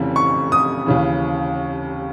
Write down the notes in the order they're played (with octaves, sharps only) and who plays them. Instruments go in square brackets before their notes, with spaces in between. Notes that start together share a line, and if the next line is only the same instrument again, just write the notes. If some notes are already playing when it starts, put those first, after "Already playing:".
Already playing: [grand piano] F1 F2 C#3 E3
C#6
D#6
D#2 C#3 E3